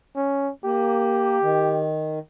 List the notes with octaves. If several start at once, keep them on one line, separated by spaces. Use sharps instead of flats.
C#4
A#3 G4
D#3